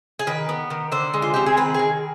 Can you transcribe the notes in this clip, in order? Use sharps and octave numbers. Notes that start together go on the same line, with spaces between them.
G#4
D#3 B4
B3
D#3
D3 C5
G#3
F4
C4 G4
G#4
D#3 B4
D#3 G#4